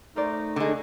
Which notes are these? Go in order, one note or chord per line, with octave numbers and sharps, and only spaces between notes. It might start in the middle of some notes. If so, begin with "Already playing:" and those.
A3 D#4 A#4 C5 D5
D3 G#3